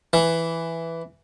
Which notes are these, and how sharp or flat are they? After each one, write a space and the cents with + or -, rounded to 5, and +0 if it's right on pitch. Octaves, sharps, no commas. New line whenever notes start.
E3 +5